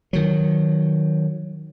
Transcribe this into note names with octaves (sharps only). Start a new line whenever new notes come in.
D#3 F#3